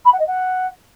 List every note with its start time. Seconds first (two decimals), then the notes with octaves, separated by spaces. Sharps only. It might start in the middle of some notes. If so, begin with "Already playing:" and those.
0.05 B5
0.12 F#5
0.19 D#5
0.26 F#5